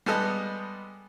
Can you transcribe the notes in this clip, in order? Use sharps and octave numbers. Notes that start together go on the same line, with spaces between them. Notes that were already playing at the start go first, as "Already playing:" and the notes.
G3 G#3 B3 A4 D#5